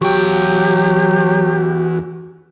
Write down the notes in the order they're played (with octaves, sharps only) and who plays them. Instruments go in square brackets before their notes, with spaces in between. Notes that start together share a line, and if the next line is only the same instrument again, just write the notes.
[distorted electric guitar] E2 G5 [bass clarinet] F#3 [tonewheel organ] F#4 [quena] G4